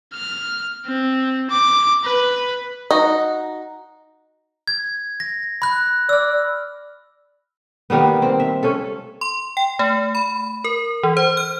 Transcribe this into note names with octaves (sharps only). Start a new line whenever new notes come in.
F6
C4
D6
B4
D#4 F#4
G#6
A#6
B5 F#6
D5 E6 F6
D#3 G3 A#3 B3
C4
E5
C#4 A4
C6
G5
A3
B5
A#4
E3
C5
F6